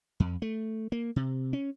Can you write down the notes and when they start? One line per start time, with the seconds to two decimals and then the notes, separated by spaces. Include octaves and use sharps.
0.20 F2
0.42 A3
0.92 A#3
1.16 C3
1.53 C#4